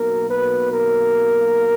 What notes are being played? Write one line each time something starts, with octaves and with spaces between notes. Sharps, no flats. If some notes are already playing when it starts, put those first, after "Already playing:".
Already playing: B1 B2 A#3 A#4
B4
A#4